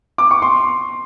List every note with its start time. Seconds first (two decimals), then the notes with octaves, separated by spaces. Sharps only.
0.18 D6
0.31 C#6
0.42 C6